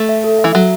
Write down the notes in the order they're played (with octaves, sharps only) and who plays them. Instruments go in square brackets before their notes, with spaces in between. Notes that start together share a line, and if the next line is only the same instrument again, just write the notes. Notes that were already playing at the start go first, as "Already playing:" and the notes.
Already playing: [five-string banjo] A3
[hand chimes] E5
A4
E5
[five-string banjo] E3
[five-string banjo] F#3 [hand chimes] E5